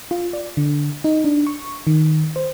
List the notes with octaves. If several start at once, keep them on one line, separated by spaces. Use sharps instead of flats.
F4
D5
D3
D#4
D4
C#6
D#3
C5